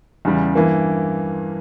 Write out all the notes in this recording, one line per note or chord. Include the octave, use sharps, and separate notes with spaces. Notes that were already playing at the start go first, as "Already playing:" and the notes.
E2 C#3 G3
G2 E3 A#3